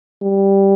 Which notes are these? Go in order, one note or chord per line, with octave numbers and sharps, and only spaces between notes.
G3